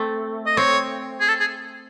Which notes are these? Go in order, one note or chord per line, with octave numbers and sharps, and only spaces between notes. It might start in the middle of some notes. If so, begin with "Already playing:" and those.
Already playing: A3 C4
D#5
C4 C#5
G#4
A4
G#4